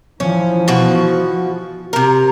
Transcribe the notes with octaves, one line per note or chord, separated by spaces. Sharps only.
E3 F3 C#4
B2 F#4
C3 A#4